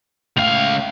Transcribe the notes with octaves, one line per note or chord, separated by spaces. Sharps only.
C#2 A2 F5 F7